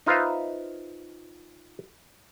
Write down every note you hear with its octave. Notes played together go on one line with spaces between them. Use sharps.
D#4 F4 B4 C5 E5 F5